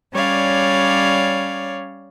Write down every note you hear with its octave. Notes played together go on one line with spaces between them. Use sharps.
G3 C#4 C#5 D5 F5